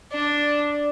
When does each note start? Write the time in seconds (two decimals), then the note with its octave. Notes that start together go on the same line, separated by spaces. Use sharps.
0.12 D4 D5